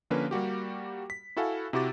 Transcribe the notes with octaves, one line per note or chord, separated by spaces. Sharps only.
D3 F3 A#3 C#4 A#4 B4
G3 A#3 F#4 G4
B6
E4 F#4 A4 F5 F#5 G#5
C3 E4 F#4 G4 D6 A6